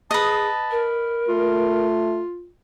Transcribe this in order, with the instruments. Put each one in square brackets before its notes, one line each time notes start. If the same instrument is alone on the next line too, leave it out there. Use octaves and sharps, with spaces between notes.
[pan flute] G#4 [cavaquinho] B4 D#5 [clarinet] A5
[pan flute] A#4
[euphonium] A3 [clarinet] F4